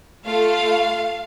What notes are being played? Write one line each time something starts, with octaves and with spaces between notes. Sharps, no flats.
A3 F4 A4 F5